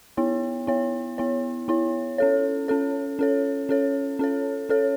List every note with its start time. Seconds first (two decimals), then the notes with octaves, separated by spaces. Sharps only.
0.17 B3 E4 C#5
0.67 B3 E4 C#5
1.18 B3 E4 C#5
1.68 B3 E4 C#5
2.18 C#4 A4 C#5
2.68 C#4 A4 C#5
3.19 C#4 A4 C#5
3.69 C#4 A4 C#5
4.19 C#4 A4 C#5
4.69 C#4 A4 C#5